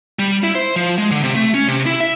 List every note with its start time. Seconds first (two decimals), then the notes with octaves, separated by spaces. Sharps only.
0.19 G3
0.43 E4
0.55 C5
0.76 F3
0.98 G#3
1.11 D3
1.23 C3
1.35 A3
1.54 C#4
1.68 C3
1.86 E4
2.00 E5